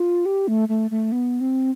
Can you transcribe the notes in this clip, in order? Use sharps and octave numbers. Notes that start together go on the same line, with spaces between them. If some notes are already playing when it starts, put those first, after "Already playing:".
Already playing: F4
G4
A3
A3
A3
B3
C4